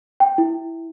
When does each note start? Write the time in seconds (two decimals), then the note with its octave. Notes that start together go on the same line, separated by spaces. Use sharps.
0.20 G5
0.38 E4